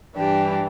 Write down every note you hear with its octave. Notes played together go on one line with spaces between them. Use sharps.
G2 E3 D4 G4